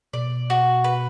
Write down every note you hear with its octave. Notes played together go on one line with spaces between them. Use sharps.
B2 D5
F#4
B4